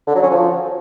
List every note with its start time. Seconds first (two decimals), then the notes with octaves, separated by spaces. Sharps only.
0.07 D3
0.15 F#3
0.23 C#4
0.31 F3